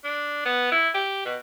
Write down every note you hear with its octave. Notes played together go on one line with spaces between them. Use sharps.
D4
B3
E4
G4
B2